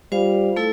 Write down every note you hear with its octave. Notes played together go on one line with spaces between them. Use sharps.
G3 F4 C5 F5
A3 E4 A4